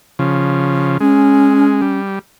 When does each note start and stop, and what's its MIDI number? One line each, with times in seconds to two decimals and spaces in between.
0.19 0.98 49
0.19 0.98 53
1.01 1.81 56
1.01 1.99 61
1.81 2.19 55